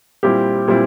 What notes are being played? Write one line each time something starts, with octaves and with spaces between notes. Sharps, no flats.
A#2 G3 C4 E4 G4
A#2 G3 C4 E4